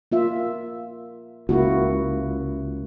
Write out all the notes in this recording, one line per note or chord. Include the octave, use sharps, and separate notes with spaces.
A#3 F4 E5
C#2 A#3 E4 F#4